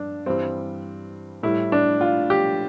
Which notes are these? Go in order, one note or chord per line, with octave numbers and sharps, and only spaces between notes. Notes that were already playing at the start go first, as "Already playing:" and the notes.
Already playing: G2 D4
G2 E3 G3 C4
A2 G3 E4
D4
F4
G4